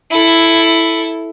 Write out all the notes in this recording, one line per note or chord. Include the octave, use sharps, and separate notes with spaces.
E4 A4